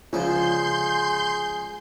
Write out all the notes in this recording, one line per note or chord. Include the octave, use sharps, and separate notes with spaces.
C#2 D3 F3 F4 G#4 C6 G6